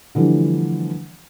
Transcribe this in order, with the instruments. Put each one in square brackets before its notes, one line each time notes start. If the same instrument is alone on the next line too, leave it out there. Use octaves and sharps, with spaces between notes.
[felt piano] D3 E3 F3 G3 A3 D4